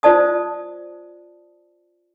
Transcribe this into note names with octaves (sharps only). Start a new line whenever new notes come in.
F4 C5 D5 A5 D#6